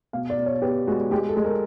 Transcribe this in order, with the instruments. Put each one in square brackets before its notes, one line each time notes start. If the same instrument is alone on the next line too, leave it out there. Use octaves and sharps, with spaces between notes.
[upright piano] B2 F5
D5
B2
C#5
B3 G4
G#3 F#4
G#3 G4
A4
G#3
A#4